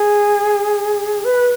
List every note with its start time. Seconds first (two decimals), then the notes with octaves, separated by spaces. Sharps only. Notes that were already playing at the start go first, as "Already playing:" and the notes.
Already playing: G#4
1.25 B4